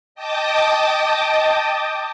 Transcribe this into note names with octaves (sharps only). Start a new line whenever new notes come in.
D#5 G5 A5 D6 D#6